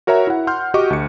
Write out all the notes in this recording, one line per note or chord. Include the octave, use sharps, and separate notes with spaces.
F#4 A#4 C#5 E5 A#5
E4 F#5
F#5 C6 F6 G6
F#4 G4 D#5 C#6 D6
D2 C#7